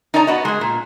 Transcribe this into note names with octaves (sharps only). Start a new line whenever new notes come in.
D#4 C#5 D5 A5 A#5
B3 F#4 D#5
G#3 G#4
A#2